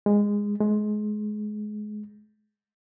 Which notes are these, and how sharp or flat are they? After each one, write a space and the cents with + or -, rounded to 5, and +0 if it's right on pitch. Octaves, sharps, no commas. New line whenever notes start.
G#3 -15
G#3 +25